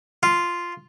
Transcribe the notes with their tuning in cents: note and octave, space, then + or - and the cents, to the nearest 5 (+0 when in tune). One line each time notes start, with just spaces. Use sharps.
F4 -5